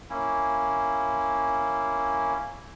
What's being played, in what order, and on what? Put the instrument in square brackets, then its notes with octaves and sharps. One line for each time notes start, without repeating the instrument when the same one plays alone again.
[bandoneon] A#3 C#4 E4